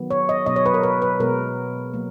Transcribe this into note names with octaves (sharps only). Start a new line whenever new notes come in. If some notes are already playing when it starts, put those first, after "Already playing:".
Already playing: D#3 F#3 B3
C#5
D#5
B2 F#3 B3 D#5
C#5
B4
A#4
B4
B4
B2 G#3 B3 A#4
F#3 A#3